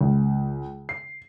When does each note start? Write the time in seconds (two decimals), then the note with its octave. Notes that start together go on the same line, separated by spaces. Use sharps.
0.01 C#2
0.89 C7